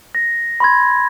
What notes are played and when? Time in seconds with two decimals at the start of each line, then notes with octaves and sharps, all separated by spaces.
0.15 A#6
0.60 B5 C6 G#6